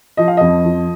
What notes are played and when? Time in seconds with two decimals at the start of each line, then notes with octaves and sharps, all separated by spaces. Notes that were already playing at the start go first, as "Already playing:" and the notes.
0.17 F3 D#5
0.28 F5
0.37 F2 D#5
0.65 F3